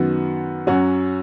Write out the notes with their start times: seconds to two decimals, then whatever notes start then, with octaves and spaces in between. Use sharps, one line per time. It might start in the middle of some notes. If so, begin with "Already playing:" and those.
Already playing: F#2 D#3 B3 F#4
0.67 F#2 F#3 C#4 F#4